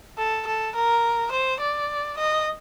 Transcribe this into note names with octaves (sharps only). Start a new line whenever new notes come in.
A4
A4
A#4
C5
D5
D#5